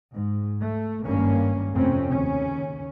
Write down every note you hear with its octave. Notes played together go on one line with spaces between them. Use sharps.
G#2
A3
G#1 G2 A#3 C#4
F2 C3 A3 C4 C#4
D#2 C#3 C#4